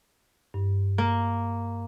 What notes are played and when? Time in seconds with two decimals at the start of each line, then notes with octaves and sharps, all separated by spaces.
0.54 G2
0.98 A#3